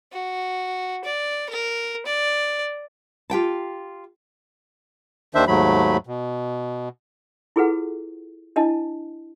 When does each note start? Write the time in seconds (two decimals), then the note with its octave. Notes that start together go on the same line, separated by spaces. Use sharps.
0.12 F#4
1.04 D5
1.49 A#4
2.06 D5
3.30 F4 G4 G5 A5
5.35 D#2 D#3 D4 C5 E5
5.47 D#2 G#2 F#3 A3 B5
6.07 B2
7.56 E4 F4 G#4 A4 B4 F#5
8.56 D4 E4 D#5 A5